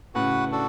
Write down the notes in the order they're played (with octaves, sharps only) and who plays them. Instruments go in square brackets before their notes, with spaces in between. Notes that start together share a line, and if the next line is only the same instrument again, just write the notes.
[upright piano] A2 C#3 [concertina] F#4 B4 F#5
[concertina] D4 F#4 A4